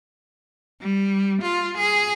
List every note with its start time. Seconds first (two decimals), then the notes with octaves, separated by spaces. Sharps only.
0.81 G3
1.42 F4
1.78 G#4